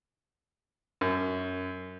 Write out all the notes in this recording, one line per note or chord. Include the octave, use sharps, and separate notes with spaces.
F#2